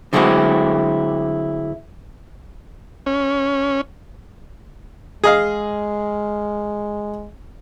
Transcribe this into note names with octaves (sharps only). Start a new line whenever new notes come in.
D3 F#3 G#3 A3 C4 E4
C#4
G#3 G#4 D#5 F5